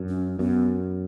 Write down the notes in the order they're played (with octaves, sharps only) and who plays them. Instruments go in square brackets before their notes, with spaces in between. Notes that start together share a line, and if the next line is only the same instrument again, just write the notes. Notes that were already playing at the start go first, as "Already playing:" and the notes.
Already playing: [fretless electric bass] F#2
[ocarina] C#4
[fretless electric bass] F#2 [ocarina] B3